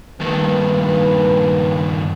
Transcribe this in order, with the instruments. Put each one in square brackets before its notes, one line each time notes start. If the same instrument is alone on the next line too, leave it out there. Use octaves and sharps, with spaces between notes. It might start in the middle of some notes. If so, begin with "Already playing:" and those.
[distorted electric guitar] G2 D#3 [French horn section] A#3 B4